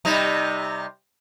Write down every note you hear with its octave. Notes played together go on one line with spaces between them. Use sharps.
C3 G3 D#4